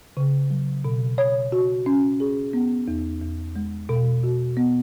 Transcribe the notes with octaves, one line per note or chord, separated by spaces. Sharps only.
C#3
F#3
B2
C#5
F#4
C#4
G#4
B3
E2
E2
G#3
B2
F#4
B3